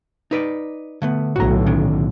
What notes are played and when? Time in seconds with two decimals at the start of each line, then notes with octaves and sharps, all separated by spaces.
0.31 D#4 B4 D5
1.02 D3 A3 B3
1.36 B1 A2 D3 F#4 A#5
1.66 D#3 C#4 D4